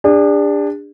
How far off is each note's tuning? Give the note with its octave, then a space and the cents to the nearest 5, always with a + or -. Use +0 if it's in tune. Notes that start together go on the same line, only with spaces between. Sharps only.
D4 +0 G#4 -45